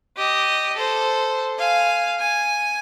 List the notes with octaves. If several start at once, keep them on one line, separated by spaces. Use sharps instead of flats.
G4 D#5
A4 C5
F5 G#5
G#5